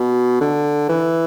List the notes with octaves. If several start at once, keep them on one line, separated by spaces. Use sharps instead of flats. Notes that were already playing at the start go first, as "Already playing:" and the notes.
Already playing: B2
D3
E3